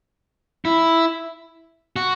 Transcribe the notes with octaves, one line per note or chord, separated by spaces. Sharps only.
E4
F#4